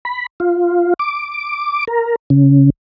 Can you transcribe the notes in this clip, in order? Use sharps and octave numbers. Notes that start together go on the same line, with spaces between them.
B5
F4
D6
A#4
C#3